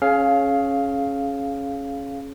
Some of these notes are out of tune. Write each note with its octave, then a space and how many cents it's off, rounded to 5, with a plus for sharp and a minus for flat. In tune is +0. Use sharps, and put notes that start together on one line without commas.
C#4 -10 G#4 +30 F5 +0